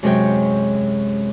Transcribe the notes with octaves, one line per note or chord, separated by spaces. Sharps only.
F#2 C3 G#3 C5 C#5 G5